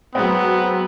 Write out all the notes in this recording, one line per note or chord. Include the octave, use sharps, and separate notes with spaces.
F#3 G#3 B3 C4